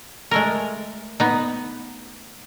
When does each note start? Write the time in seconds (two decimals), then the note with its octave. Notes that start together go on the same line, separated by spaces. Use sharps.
0.31 G#3 A3 A#4
1.20 B3 D#4